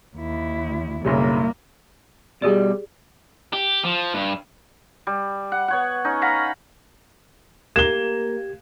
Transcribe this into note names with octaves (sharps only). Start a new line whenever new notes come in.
D#2 E4
F#1 B1 C#3 G3 A#3
B2 G3 G4 G#4 D5
G4
F3
G2
G3
F#5
B3 C#5 F#5
C#4 D#4
F5 F#5 A#5 B5
A#3 G4 G#6 E7 G7